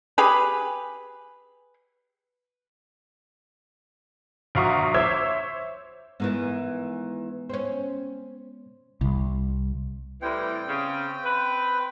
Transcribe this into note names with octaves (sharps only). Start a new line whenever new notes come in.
G4 G#4 B4
A#1 F#4 F5 A#5 C#6 D#6
C5 C#5 E5 D6 E6 G#6
G#2 D#3 E3 G#3 B3
C4 C#4
C2
A2 E3 G3 C4 G5
C#3
B4